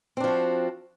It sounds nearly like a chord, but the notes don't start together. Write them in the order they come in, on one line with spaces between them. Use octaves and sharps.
C4 D4 F3 F#4